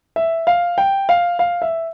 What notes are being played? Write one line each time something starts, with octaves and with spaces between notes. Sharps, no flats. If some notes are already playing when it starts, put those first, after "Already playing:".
E5
F5
G5
F5
F5
E5